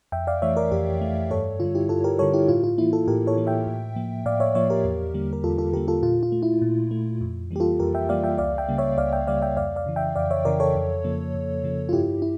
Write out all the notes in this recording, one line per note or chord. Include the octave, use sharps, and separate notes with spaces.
F2 E5 G5
D5 F5
E3 A3 C#5 E5
A#4 D5
F2 G4 A#4
E3 A3
G2 A4 C#5
D3 G3 F4
E4 G4
G2 F4 A4
G4 A#4
D3 G3 A4 C#5
E4 G4
A2 F4
F4
E3 A#3 E4
F4 A4
A2 G4 A#4
A4 C#5
E3 A#3
E5 G5
A2
F3 A#3
A2 D5 F5
C#5 E5
F3 A#3 C#5 E5
G4 A#4
E2
D3 G3 A#3
A#4
E2 F4 A4
F4 A4
D3 G3 A#3 G4 A#4
F4 A4
A#2 F4
F4
A3
E4
A#2
A3
F2
E3 G3 A#3 G4
F4 A4
F2 G4 A#4
E5 G5
E3 G3 A#3 D5 F5
E5 G5
C#2 D5 F5
E5 G5
C#3 G3 A#3
C#5 E5
C#2 D5 F5
E5 G5
C#3 G3 A#3 D5 F5
E5 G5
F2 D5 F5
D5 F5
C#3 E3
E5 G5
F2 D5 F5
C#5 E5
C#3 E3 A#4 D5
A4 C#5
F2
C#3 F3 A#3
F2
C#3 F3 A#3
F4
G2 E4 G4
E4